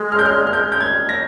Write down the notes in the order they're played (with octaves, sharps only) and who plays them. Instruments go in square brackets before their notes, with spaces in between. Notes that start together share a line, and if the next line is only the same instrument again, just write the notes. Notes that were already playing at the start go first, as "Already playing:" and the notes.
Already playing: [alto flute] G#3
[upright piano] F6
G6
F6
F6
G6
G6
G#6
A#6